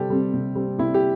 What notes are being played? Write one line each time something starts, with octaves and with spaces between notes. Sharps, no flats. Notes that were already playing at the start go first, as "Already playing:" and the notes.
Already playing: C3 G3 C4 G4 A4
G3 C4
C3
G3 C4
C3 E4
G4